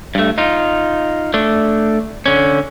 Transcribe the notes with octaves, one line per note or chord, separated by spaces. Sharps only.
G2 A3
D#4 F4
A3 D4
D3 C#4